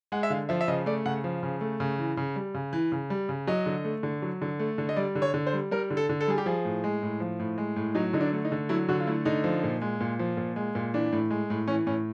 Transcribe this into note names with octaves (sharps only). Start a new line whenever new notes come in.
G#3 F#5
E5
D3 F5
F3 E5
E5
C#3 D#5
A3 D5
C#3 F#5
F3
C#3
A3
C#3
E3
C#3
G3
C#3
E3
C#3
G3
C#3
F#3 D#5
D3
A3
D3
F#3
D3
A3
D3
D#5
G3 D5
D3
C#5
D3
C5
G3
G3 A#4
D3
A4
D3
A4
G3 G#4
G4
F3 G#4
A2
G#3
A2
F3
A2
G#3
A2
F#3 D#4
D3 D#4
D4
A3
D#4
D3
F#3 E4
D3 F#4
F4
A3 E4
D3 D#4
F3
A#2
G#3
A#2
F3
A#2
G#3
A#2
E3 D4
A2
G#3
A2
E3 C#4
A2 C#4